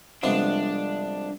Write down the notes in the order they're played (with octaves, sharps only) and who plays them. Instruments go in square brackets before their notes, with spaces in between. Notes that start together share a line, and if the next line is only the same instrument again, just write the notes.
[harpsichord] C2 C3 F3 G#3 B3 [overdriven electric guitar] D4